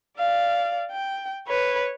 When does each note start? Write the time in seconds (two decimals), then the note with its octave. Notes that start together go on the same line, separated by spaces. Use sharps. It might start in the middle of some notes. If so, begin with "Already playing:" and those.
0.18 D5 F5
0.92 G5
1.47 B4 C#5